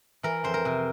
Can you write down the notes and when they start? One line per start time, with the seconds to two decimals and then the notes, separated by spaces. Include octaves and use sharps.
0.23 E3 A#4
0.44 F2 C5
0.54 A#4
0.65 C3